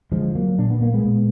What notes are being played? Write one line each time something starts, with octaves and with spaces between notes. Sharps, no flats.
D3 F3 G#3
F#3 A#3
A#2 D4
B3
A#3
G#3 B3
A#2